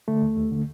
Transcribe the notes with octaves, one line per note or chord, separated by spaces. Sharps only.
D3 A3
D#2
D#2
D3